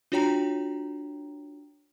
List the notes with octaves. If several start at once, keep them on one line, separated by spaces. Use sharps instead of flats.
D4 F4 F#4 C#5 G5 A#5